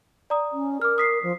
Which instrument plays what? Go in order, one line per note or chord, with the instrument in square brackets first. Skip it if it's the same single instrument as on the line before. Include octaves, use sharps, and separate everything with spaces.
[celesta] D5 A#5 D#6
[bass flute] C#4
[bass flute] A#4 [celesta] D6 F6
[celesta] D#6 B6 C7
[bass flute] F3